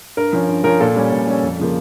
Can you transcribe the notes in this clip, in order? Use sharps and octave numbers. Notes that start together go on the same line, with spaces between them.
G2 A#4
F3 C#4
G2
F3 C#4 A#4
A#2 A4
G3 C#4
A#2
G3 C#4
F2
C#3 F3 A#3